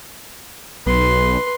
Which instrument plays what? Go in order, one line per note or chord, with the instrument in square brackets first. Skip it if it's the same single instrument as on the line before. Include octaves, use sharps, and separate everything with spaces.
[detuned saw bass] B1 [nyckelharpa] B4 C6